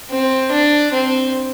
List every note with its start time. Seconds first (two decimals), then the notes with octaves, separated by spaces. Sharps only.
0.11 C4
0.52 D4
0.93 C4